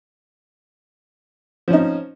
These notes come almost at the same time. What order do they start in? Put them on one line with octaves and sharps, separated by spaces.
F3 C#4 D#4